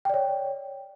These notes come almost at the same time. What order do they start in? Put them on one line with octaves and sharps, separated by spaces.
G5 D5 C#5